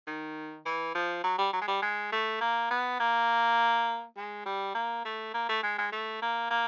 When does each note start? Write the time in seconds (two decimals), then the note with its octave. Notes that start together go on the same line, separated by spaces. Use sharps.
0.07 D#3
0.66 E3
0.95 F3
1.24 F#3
1.38 G3
1.53 F#3
1.62 G#3
1.68 G3
1.82 G#3
2.12 A3
2.41 A#3
2.70 B3
3.00 A#3
4.17 G#3
4.46 G3
4.75 A#3
5.05 A3
5.34 A#3
5.49 A3
5.63 G#3
5.78 G#3
5.92 A3
6.22 A#3
6.51 A#3